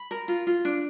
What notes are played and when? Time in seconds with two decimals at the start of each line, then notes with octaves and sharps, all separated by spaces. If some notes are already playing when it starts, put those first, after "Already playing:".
Already playing: B5
0.11 A#4
0.28 F4
0.47 F4
0.65 D4